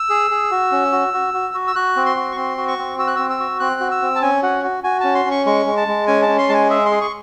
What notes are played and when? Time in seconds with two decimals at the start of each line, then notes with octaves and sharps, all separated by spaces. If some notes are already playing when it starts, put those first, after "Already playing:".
Already playing: E6
0.10 G#4
0.31 G#4
0.51 F#4
0.72 C#4
0.92 F#4
1.14 F#4
1.34 F#4
1.54 F#4
1.67 E6
1.75 F#4 F#6
1.96 C4
2.06 C6
2.17 F#4
2.32 C#6
2.37 C4 C6
2.58 F#4
2.68 C#6
2.78 C4
2.98 F#4 E6
3.07 F#6
3.16 C4 E6
3.30 E6
3.39 F#4
3.60 C4 F#6
3.81 F#4
3.91 E6
4.02 C4
4.15 A5
4.22 C#4 G#5
4.43 F#4 F#5
4.64 F#4
4.84 F#4 G#5
5.00 C#4 A5
5.15 C6
5.25 C#4
5.31 C#6
5.46 G#3 C#6
5.66 G#3
5.77 A5
5.88 G#3
6.07 C#4 G#5
6.23 A5
6.28 C#4
6.38 C6
6.49 G#3 G#5 A5
6.70 G#4 E5
6.85 C6
6.91 G#4
7.01 C#6